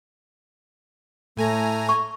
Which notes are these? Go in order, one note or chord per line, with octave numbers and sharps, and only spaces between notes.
A2 A3 G#5 A#5
C#6